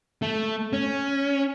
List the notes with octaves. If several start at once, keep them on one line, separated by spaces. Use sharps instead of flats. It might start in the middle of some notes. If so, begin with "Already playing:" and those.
A3
C#4